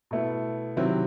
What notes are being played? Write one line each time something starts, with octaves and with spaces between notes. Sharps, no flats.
B2 A3 E4
C3 D#3 F#3 C4 E4